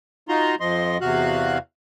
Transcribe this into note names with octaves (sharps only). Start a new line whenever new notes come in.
D#4 F4 F#4 A#5 C6
F2 F3 D#5 C6
E2 C3 F#4 F5 F#6